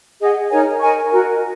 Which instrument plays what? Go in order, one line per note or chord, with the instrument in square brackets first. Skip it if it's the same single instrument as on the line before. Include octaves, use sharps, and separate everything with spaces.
[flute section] G#4 D#5 F#5
D#4 A#4 C#5 G#5
A#4 D#5 G#5 C#6
F#4 A#4 D#5